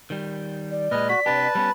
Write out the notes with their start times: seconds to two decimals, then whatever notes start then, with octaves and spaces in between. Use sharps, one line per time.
0.10 D#3 G3
0.71 D5
0.91 A#2 G#3 B4 D#5 F6
1.09 F#4 B6
1.26 C3 D4 G4 B4 A5
1.55 G3 B3 C#4 B5